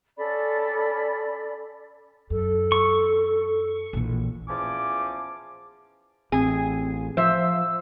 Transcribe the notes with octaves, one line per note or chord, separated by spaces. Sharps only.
C#4 A4 D5 B5
F#2 A4
C#6
A#1 E3
E2 F3 C#4 D6
A1 C4 G#4
F3 C5 E5 E6